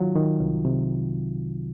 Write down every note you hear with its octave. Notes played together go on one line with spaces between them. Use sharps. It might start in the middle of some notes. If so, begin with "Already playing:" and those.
Already playing: D#3 F#3 F4
D#3
C2
C3